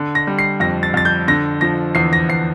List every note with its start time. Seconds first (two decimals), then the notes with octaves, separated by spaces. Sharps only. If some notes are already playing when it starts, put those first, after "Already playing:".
Already playing: D3
0.15 A#6
0.27 G3
0.39 C7
0.60 F2 A#6
0.83 A6
0.94 F2 A6
1.05 G6
1.28 D3 A#6
1.61 F3 A#6
1.95 E2 C7
2.13 A#6
2.29 E2 C7